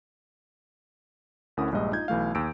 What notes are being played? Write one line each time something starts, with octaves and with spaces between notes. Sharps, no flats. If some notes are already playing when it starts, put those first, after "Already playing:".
D2 C#4 E4 A#4 F#5 D#6
A#1 G2 G#3 D#5
D#4 F4 D#5 G6 G#6
B1 E3 A3 F5
D#2 E6 D7